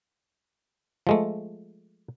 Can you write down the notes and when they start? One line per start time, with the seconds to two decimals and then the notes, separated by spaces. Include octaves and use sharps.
1.07 F3 G#3 A3